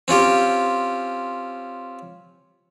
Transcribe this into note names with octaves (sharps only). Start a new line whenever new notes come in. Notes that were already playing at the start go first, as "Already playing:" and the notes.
C4 C#4 F4 G4